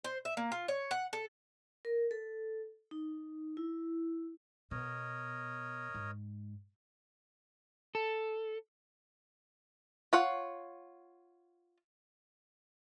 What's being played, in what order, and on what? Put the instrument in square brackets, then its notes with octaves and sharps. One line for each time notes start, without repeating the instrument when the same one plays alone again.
[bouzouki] C5
E5
A#3
F4
C#5
F#5
A4
[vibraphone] A#4
A4
D#4
E4
[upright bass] B2 [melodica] A#4 C#5 D#5
[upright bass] G#2
[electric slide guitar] A4
[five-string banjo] F4 C#5 F#5